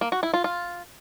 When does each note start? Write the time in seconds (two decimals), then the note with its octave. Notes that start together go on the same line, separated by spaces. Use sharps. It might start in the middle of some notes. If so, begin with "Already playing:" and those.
0.01 A#3
0.12 F#4
0.23 E4
0.34 F4
0.44 F4